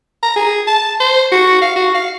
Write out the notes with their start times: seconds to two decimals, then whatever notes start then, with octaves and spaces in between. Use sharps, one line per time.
0.23 A#5
0.36 G#4
0.68 A5
1.00 C5
1.32 F#4
1.62 F5
1.76 F#4
1.95 F5